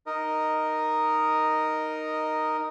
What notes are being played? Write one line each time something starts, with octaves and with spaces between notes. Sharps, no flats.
D#4 A#4 D#5